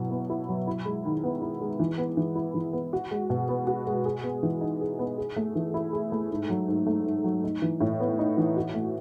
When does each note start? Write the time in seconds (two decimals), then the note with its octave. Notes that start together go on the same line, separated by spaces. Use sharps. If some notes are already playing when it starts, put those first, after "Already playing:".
Already playing: B2 F#3 E4
0.11 B3
0.30 E4
0.49 F#3
0.67 E4
0.85 G#3
1.05 D#3
1.24 B3
1.42 E4
1.61 G#3
1.80 E3
1.98 B3
2.17 E3
2.35 E4
2.54 E3
2.73 B3
2.93 F#4
3.11 G#3
3.30 B2
3.49 B3
3.67 F#4
3.87 G#3
4.05 G#4
4.23 B3
4.43 E3
4.61 D#4
4.81 G#4
4.99 B3
5.18 G#4
5.36 A3
5.56 E3
5.74 E4
5.93 G#4
6.12 A3
6.31 G#2
6.50 F#3
6.68 G#2
6.87 A3
7.06 G#2
7.24 F#3
7.44 D#4
7.62 E3
7.80 A2
8.00 B3
8.19 D#4
8.37 E3
8.56 F#4
8.74 A3